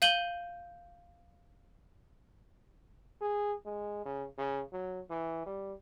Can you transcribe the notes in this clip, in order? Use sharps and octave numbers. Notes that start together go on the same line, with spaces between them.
F5 G6 D#7 F#7 G7
G#4
G#3
C#3
C#3
F#3
E3
G3